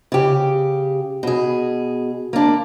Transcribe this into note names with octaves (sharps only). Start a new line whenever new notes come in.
C#3 G4
B2 G#4
A#3 D4